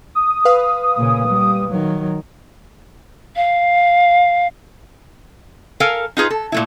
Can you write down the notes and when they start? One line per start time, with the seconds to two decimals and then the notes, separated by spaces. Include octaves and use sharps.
0.15 D#6
0.45 B4 F5
0.97 A#2 C#3
1.27 G3
1.70 D#3 F#3
3.36 F5
5.80 A4 A#4 F5 G#5
6.17 D#4 F4 G#4 B4
6.30 A4
6.52 A#2 A3 E4